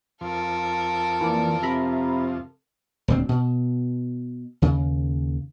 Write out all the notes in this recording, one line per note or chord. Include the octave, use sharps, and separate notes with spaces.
F2 F3 C4 A4 A#4
E3 A#3 D5
C3 E5 A#5 B5
D#1 D2 C4
B2
D#2 C#3